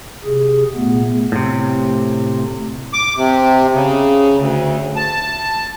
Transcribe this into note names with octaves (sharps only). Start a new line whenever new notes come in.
C3 G#4
A#2 A3 B3
A2 C3
D6
C3
C#3
D2
A5